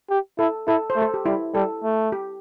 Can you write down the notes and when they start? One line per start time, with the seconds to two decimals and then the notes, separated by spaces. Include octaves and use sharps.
0.10 G4
0.39 E4 A4
0.67 E4 A4
0.90 C5
0.96 A3
1.02 A4
1.14 G4
1.26 G3 E4
1.55 G3 A4
1.84 A3
2.12 G4